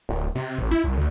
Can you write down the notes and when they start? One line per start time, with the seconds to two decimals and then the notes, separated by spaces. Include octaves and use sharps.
0.09 D1
0.35 C3
0.58 A1
0.71 E4
0.84 C2
0.97 D2